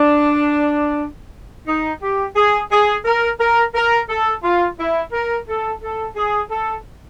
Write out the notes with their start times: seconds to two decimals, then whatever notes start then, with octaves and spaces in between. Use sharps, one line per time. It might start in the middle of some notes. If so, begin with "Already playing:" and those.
Already playing: D4
1.67 D#4
2.02 G4
2.36 G#4
2.71 G#4
3.04 A#4
3.39 A#4
3.74 A#4
4.09 A4
4.43 F4
4.78 E4
5.12 A#4
5.47 A4
5.82 A4
6.16 G#4
6.50 A4